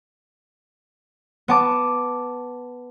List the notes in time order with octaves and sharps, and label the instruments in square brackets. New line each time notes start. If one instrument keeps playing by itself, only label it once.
[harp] B3 A5 D6